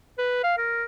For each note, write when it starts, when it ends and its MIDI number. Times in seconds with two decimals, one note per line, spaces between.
0.18 0.40 71
0.44 0.56 77
0.58 0.84 70